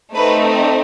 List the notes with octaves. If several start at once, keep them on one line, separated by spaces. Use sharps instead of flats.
A3 C4 D#4 B4